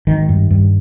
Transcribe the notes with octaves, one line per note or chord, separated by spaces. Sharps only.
G#1 D#3
G2
G2